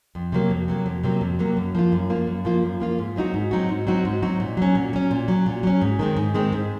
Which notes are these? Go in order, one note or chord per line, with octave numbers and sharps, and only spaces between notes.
F2
C3 F#3 A#3
F2
C3 F#3 A#3
F2
C3 F#3 A#3
F2
C3 F#3 A#3
F#2
F3 A#3 F4
F#2
F3 A#3 F4
F#2
F3 A#3 F4
F#2
F3 A#3 F4
G#2
F#3 C4 D#4 F#4
G#2
F#3 C4 D#4 F#4
G#2
F#3 C4 D#4 F#4
G#2
F#3 C4 D#4 F#4
A#2
F#3 C#4
A#2
F#3 C#4
A#2
F#3 C#4
A#2
F#3 C#4
G#2
D#3 G#3 C4
G#2
D#3 G#3 C4
G#2